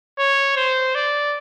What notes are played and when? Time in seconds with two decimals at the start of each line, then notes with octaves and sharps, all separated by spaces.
0.19 C#5
0.57 C5
0.95 D5